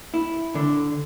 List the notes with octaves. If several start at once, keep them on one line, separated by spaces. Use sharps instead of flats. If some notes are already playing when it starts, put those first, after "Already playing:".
E4
D3